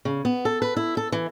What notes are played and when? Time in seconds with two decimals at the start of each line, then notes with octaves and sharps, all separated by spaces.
0.05 C#3
0.25 B3
0.45 A4
0.62 B4
0.77 E4
0.97 A4
1.12 E3